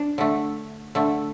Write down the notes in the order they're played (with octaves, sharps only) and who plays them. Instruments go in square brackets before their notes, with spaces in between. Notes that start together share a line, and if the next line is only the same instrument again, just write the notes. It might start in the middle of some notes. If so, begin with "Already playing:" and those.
Already playing: [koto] D4
D3 A3
D3 A3